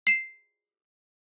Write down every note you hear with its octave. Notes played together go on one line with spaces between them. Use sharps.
C7 E7